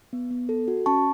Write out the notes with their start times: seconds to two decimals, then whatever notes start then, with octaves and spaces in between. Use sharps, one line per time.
0.13 B3
0.31 B3
0.49 A4
0.68 F#4
0.86 C#4 A5 C#6